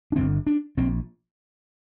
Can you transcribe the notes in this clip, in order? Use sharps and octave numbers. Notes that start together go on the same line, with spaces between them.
D4
G1 G2 D3 C4
D4
A#1 A#2 C4